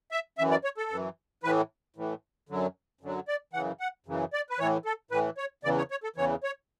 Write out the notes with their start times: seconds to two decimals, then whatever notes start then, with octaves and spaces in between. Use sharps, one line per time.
0.12 E5
0.38 F#2 E3 E5
0.51 D5
0.64 C#5
0.77 A4
0.91 F#2 E3
1.43 A2 E3 B4
1.96 A2 E3
2.49 F#2 D3 F#3
3.01 F#2 D3 F#3
3.28 D5
3.53 F#2 C#3 E3 F#5
3.80 F#5
4.06 F#2 C#3 E3
4.33 D5
4.50 B4
4.59 A2 E3 C#5
4.85 A4
5.11 A2 E3 B4
5.37 C#5
5.63 E2 C#3 E3 D5
5.78 C#5
5.91 C#5
6.03 A4
6.16 E2 C#3 E3 C#5
6.43 C#5